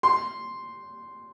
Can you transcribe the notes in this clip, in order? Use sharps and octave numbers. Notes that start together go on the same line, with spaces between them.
C6